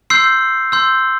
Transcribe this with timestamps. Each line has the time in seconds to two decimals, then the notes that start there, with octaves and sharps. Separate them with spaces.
0.10 C6 E6 G6 C7
0.72 C6 E6 G6